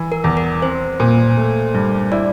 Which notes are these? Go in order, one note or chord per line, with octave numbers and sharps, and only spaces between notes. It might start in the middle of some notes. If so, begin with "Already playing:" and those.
Already playing: E3
A#4
E2
A#4
C4 C5
A#2
A3
G2
E4 D5